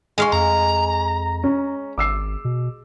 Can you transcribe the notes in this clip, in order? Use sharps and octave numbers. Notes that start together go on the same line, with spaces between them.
G#3 F5 G#5 C6 C#6
F2 A#5
C#4
G#1 D6 E6 C7
B2